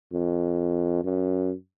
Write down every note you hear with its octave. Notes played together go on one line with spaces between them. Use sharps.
F2
F#2